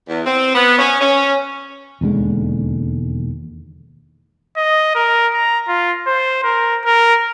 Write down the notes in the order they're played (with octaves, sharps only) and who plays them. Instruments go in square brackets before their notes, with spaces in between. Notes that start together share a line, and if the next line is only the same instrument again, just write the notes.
[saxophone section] E2
C4
B3
C#4
C#4
[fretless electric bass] E1 D#2 D3 G#3
[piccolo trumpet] D#5
A#4
A#5
F4
C5
A#4
A#4